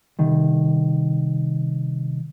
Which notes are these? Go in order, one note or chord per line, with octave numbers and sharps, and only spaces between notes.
C2 D#3